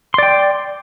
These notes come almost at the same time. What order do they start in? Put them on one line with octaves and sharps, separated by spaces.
C6 D5 G5